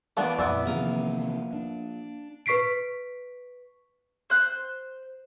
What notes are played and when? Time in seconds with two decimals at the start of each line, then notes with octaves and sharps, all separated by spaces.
0.17 E3 A#3 B3 D4
0.39 F2 A#2 B3 E4 D5
0.66 A#1 C3 D#3 E3 A#4
1.53 D4
2.46 B4 C#6 B6 C7 D7
4.30 C5 F#6